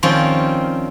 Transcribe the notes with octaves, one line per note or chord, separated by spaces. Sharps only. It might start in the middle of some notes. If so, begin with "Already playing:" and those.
D#3 F3 G3 C4 C#4